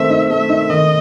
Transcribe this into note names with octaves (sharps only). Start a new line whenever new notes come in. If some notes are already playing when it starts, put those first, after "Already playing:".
Already playing: D#3 A3 C4 E5
D#4
A3 E5
D#4
D#3 D#5